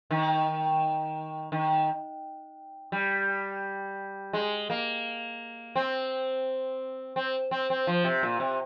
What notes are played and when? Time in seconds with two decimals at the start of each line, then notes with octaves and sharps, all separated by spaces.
0.11 D#3
1.52 D#3
2.92 G3
4.33 G#3
4.70 A#3
5.76 C4
7.16 C4
7.51 C4
7.70 C4
7.87 F3
8.04 C3
8.23 A#2
8.40 C3